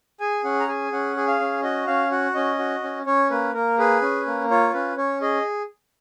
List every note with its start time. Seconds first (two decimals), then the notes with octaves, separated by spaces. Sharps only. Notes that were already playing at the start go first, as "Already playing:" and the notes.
0.20 G#4 G#5
0.44 C#4 F#5
0.60 A#5
0.68 G#4 G#5
0.92 C#4 F#5
1.16 G#4
1.27 F5
1.40 C#4
1.63 F#4 D#5
1.87 C#4 F5
2.11 F#4 F#5
2.34 C#4 D#5
2.59 F#4
2.83 C#4
3.06 C#4 C#5
3.30 A#3 B4
3.54 A#3 A#4
3.78 G#4 B4
4.02 C#4
4.27 A#3
4.50 F4 C#5
4.74 C#4 B4
4.97 C#4 C#5
5.21 G#4 D#5